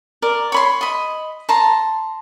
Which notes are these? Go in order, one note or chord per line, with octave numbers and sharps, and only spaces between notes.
A#4 D5
C#5 B5 C6
D#5 B5
A5 A#5 C6